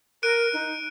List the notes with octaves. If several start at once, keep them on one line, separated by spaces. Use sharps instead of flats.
A#4 F#6 D7 D#7
D#4